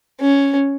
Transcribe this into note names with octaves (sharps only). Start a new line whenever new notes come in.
C#4